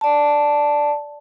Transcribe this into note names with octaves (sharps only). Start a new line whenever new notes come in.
D5 A5